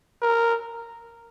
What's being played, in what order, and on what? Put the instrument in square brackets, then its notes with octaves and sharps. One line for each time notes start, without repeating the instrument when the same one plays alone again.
[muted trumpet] A#4